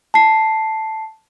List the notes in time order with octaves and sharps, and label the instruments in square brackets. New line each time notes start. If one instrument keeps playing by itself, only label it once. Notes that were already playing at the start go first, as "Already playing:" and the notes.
[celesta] A5 C7